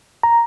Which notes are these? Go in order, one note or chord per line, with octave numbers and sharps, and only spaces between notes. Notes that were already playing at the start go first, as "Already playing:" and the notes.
A#5